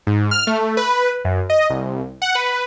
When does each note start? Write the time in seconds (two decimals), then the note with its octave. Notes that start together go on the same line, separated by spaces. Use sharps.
0.07 G#2
0.31 F6
0.47 A3
0.77 B4
1.25 F#2
1.50 D#5
1.70 C2
2.22 F#5
2.35 B4